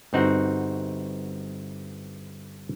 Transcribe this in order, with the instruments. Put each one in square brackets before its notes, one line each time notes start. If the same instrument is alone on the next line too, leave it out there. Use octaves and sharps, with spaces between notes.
[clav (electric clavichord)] G1 B3 C4 D#4 F#4 F#5